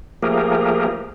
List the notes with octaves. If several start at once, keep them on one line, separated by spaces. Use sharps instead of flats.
F3 A3 A#3 G4 G#4 A#4